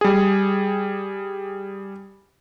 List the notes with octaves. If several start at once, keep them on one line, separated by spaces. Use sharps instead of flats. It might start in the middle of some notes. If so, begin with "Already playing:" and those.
G3 G#4